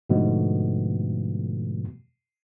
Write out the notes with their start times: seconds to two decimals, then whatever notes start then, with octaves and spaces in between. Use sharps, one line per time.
0.10 G#2 B2 D3 F3 A3